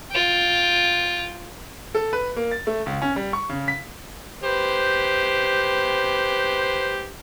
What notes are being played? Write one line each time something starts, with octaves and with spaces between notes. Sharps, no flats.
F4 G5
A4
B4
A#3
A6
A3
C#2
C#4
G3
C#6
C#3
B6
G4 B4 C5